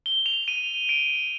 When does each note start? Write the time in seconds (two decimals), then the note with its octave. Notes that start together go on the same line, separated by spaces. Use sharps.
0.06 G7
0.26 F7
0.48 D#7
0.89 D7
1.10 D7